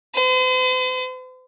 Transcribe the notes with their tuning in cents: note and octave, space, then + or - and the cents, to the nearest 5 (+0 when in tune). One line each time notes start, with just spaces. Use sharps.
C5 -45